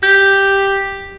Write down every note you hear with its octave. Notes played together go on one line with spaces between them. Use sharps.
G4 G6